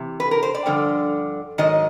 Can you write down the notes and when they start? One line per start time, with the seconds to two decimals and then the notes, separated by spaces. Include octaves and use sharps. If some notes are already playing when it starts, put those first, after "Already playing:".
Already playing: C3 E3
0.20 B4
0.31 A#4
0.43 C5
0.54 D5
0.66 G2 D3 F3
1.58 G#2 D#3 F#3 D#5